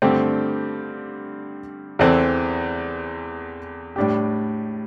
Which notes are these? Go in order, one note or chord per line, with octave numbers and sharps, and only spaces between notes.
G2 D3 A3 C4 G4
E2 E3 C4 A4
A2 G3 D4 G4